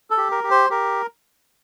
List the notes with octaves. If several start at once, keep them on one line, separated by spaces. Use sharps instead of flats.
A4
G4
A#4
G4
C5
G4 A#4